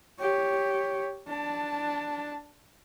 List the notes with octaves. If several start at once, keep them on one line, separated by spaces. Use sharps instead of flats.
G4 C#5
D4 A5